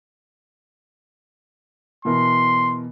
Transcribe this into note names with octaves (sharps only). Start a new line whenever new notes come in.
B2 E3 A#4 C6